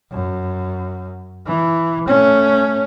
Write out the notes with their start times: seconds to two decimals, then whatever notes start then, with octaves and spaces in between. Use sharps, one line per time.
0.12 F#2
1.47 E3
2.08 A3 C#4